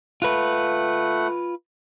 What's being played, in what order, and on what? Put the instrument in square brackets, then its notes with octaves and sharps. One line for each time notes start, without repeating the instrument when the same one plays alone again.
[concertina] A3 F#5 [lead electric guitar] F4 B4